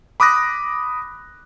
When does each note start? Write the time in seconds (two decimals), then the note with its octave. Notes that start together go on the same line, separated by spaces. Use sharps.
0.20 B5 D6 D#6 F#6 A#6